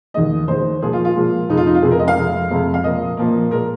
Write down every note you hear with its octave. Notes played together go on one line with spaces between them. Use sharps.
D#2 D#3 G#3 D#5
D#2 D#3 G#3 C5
A#2 F3 G#3 G#4
F4
F4
A#2 F3 G#3
F2 C3 G#3 D#4
F4
D#4
F4
F2 C3 G#3 G#4
A#4
D#5
F5
F2 C3 G#3
F2 C3 G#3
F5
A#2 F3 A#3 D#5
A#2 F3 A#3
A#2 G#3 A#4